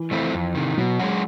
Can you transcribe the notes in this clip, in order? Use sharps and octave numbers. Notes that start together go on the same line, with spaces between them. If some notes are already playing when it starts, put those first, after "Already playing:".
Already playing: E3
F3 A3 C4 E4
F2
C3 D#3
B2 F#3
G#3 C#4 F#4